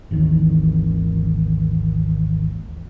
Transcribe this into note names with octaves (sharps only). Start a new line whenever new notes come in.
G#1 D#2 D#3 E3